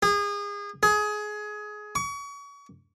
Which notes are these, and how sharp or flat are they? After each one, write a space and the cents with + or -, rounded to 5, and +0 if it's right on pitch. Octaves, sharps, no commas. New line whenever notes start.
G#4 -30
G#4 +20
C#6 +35